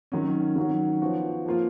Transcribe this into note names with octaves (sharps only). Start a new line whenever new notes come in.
D#3 F#3 C#4
D#3 F#3 C#4 F#4
F3 B3 F#4
F3 A#3 F4